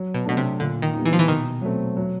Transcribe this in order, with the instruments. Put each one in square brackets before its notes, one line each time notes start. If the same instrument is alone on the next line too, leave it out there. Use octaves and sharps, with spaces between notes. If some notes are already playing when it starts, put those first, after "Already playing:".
Already playing: [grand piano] F#3
[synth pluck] B2
[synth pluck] B2 [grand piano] A3 D4
[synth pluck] C3
[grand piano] A#2 [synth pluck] D3
[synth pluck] D#3
[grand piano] G3 B3 D#4
[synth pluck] E3
F3
E3
[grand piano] B2 [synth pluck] D#3
[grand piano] F#3 A3 C4
F#3